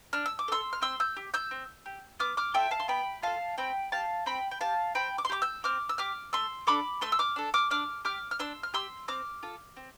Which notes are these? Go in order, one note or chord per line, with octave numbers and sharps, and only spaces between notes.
D4 F6
E6
D6
A4 C6 E6
F6
C4 C6 E6
E6 G6
G4
E6 G6
C4
G4
B3 D6 F6
D6 F6
F4 A4 E5 G5
F5 A5
C6
B3 G5 B5
F4 A4 F5 A5
C4 G5 B5
G4 F5 A5
C4 G5 B5
G5
G4 F5 A5
C4 G5 B5
D6
C6
G4 B5 D6
E6 G6
C4 D6 F6
E6
G4 D6 F6
A3 C6 E6
D4 A4 B5 D6
A3 C6 E6
E6
D6 F6
D4 A4
D6 F6
D4 D6 F6
G4 D6 F6
F6
D4 C6 E6
F6
G4 C6 E6
C4 D6 F6
F4 A4
C4